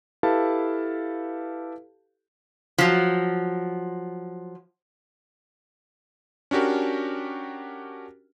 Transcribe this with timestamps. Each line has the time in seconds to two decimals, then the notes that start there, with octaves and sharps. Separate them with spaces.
0.23 E4 G4 A4 B4 F5 A5
2.78 F3 F#3
6.51 C#4 D4 F#4 G4 A#4